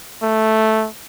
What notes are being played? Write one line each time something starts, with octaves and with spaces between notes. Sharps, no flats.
A3